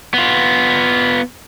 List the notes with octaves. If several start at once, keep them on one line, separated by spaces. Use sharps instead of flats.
B3 F4